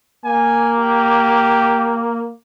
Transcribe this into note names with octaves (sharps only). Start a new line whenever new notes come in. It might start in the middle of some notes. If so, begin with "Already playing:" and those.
A#3 G#5
G4